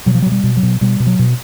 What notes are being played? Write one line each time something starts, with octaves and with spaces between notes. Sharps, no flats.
B2 F#3
F3
F#3
B2
G3
B2
F#3
B2
B2 G3
B2
F#3
B2